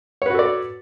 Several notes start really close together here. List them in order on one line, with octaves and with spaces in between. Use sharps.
C#5 B4 F#4 A4 D5